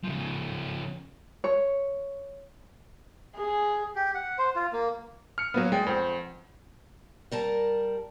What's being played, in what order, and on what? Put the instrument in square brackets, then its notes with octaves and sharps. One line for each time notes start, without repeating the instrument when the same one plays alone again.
[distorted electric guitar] C#3 F3
[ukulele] C#5
[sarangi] G#4
[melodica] G4
F#5
C5
F4
A#3
[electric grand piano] F6 C#7
[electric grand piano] F#3 B3 [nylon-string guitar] A#3 B4 C#5
[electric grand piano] G#3 [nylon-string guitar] D5 G5
[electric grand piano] F2 [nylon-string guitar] C5 F#5
[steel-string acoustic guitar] G3 A#4 A5